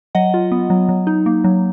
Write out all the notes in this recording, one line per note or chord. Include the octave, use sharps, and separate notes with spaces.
F#3 D#5 F#5
F4
B3
F#3
F#3
D#4
A#3
F#3